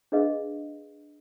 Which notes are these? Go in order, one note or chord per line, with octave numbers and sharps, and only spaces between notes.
D4 G#4 B4 D#5 F5